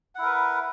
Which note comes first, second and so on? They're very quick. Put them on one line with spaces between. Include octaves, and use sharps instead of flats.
F#5 E4 A#4 B4